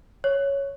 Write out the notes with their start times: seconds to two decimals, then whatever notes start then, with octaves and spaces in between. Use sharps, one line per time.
0.24 C#5